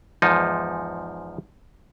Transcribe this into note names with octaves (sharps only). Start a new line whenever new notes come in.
E2 G#2 F3 D#4